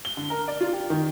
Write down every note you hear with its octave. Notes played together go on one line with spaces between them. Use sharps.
G7
D3
A#4
D5
F4
G4
D#3